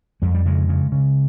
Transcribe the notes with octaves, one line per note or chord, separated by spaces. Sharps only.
F2 G#3
G3
C#3 G#3
C#3
C#3